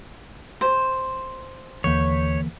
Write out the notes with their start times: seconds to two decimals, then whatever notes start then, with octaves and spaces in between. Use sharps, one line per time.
0.61 C5
1.84 D#2 D3 E3 A#3 C#5 G6 B6